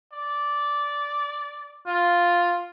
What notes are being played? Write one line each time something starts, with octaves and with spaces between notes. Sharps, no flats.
D5
F4